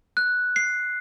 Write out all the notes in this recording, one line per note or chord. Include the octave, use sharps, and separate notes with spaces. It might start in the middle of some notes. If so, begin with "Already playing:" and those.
F#6
C7